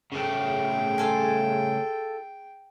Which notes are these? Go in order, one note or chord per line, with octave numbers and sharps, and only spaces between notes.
C#3 A3 G#4 G5
F4 A4 G#5